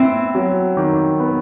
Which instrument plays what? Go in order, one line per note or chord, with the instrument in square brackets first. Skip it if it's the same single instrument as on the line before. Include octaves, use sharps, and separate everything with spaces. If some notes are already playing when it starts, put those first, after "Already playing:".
Already playing: [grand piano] B3 E4 [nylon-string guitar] C4
[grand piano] F#3
D#3
B3